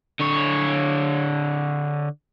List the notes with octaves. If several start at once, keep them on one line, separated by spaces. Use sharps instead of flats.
D3 C#5